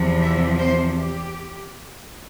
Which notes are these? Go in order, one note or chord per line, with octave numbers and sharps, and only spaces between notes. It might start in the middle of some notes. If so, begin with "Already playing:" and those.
Already playing: E2 C3 F3
E5
C5
G4